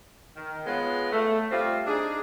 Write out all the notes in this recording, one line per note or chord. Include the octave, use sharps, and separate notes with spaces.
D#3
G#3 B3 F4 C#5 F#5
A3
G3 A3 C4 F4
D4 D#4 G#4